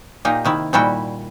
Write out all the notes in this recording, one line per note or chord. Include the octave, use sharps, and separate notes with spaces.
A#2 A#3 D#4 G4
C3 D#3 E4
A#2 D#3 G3 E4 F#4 G5